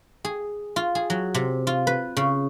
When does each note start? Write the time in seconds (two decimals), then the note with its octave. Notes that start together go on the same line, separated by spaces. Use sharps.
0.25 G#4
0.76 F4
0.95 G#4
1.10 F#3
1.34 C3
1.67 F4
1.87 B4
2.17 C#3